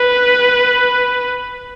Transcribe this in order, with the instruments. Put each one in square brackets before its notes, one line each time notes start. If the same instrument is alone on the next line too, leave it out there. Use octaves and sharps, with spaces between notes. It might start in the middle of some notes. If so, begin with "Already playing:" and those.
Already playing: [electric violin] B4